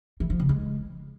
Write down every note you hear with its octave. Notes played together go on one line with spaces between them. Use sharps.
E3
F3
C#3
G#3